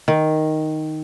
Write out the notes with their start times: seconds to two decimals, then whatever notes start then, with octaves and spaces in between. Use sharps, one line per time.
0.08 D#3